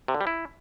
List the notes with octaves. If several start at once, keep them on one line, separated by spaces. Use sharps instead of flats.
C3
D3
G3
E4